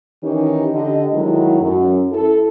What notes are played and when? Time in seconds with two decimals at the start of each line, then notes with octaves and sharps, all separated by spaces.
0.23 D#3 E3 C#4 D#4 G4
0.74 D3 G4 D#5
1.13 D#3 F#3 G#3 A3 E4
1.61 F#2
2.12 E4 A4